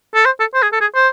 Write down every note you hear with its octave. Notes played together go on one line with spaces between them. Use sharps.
A4
C5
A4
C5
G#4
A4
G#4
C5